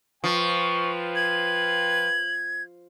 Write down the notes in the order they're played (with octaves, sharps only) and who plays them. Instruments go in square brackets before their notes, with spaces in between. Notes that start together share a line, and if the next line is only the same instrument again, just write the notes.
[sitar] F3 [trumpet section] F4 B4 G5 [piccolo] C#6
[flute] G#6 [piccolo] F#7